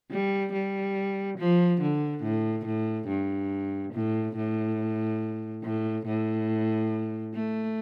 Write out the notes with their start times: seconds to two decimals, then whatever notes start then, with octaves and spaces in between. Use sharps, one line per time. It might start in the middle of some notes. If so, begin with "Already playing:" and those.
0.11 G3
0.53 G3
1.38 F3
1.81 D3
2.23 A2
2.66 A2
3.08 G2
3.94 A2
4.36 A2
5.64 A2
6.07 A2
7.35 A3